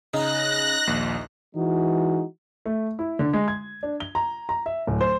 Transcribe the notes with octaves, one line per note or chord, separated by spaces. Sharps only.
C#3 D#4 A#5 F#6 A#6
A#1 D#2
E3 G#3 D#4 F#4
A3
E4
D3
G#3
G#6
D4
G7
A#5
A#5
E5
D1
C5